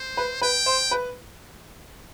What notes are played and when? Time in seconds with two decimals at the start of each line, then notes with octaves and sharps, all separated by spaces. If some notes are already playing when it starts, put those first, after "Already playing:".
Already playing: C5
0.17 B4
0.41 B4 G5
0.66 C5
0.91 B4